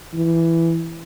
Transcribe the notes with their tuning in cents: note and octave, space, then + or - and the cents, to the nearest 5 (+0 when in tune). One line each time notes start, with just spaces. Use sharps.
E3 +10